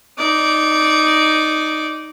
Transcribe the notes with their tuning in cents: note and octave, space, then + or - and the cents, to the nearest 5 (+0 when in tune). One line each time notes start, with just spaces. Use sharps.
D#4 +0 D5 -10